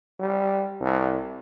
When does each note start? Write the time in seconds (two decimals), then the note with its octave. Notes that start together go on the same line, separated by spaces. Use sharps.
0.19 G3
0.80 C2